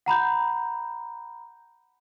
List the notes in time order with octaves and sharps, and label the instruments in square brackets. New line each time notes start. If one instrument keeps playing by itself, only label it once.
[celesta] F#5 A#5 B5 G6